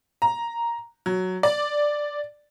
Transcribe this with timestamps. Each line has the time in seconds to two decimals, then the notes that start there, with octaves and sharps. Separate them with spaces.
0.22 A#5
1.06 F#3
1.43 D5